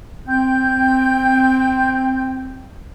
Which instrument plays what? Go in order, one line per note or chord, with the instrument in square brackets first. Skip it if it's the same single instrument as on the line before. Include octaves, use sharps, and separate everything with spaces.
[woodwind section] C4 [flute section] G5 G6